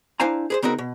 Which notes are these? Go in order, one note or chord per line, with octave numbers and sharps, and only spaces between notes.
D4 E4 C5 F5 G#5 A#5
G#4 B4 C5
C#3 B3 C4 D#4 F#4 A#4
B2